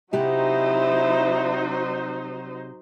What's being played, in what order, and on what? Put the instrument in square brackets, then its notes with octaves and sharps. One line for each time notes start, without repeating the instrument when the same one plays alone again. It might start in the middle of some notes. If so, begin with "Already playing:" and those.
[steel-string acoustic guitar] C3 G4 F#5 [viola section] F#3 D#4 C5 [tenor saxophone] E4